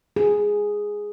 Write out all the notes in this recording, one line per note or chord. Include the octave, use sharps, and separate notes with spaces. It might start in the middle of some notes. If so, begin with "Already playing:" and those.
G#4